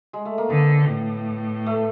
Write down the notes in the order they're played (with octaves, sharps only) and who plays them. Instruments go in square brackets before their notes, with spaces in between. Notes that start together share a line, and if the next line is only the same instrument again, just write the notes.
[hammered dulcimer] G#3
A3
A#3
[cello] D3 [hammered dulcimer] B3
[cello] A2
[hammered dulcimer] A3